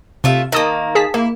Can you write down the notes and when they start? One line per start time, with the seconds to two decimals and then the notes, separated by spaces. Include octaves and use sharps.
0.24 C3 A3 F4 E5
0.52 D#3 A#3 D#5 A5 D#6
0.95 G#4 A5 B6
1.14 A#3 E4